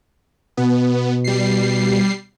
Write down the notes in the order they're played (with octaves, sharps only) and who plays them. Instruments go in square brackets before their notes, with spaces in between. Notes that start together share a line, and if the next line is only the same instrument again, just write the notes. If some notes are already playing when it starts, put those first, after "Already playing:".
[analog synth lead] B2 [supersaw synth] B3
[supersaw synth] G3 C7